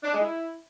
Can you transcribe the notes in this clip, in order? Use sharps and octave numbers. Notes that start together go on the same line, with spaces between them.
D4
G#3
E4